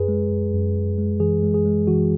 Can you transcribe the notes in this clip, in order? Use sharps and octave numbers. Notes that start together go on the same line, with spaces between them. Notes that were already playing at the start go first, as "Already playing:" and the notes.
Already playing: F#2 G#4 B4
G#3
F#2
F#2
F#2
G#3
E3 G#4
G#3
G#4
G#3
E3 F#4